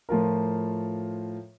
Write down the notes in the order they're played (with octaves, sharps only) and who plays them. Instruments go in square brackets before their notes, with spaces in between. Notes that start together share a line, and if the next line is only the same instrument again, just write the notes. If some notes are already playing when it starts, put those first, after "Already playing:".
[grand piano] A2 F3 F4 A#4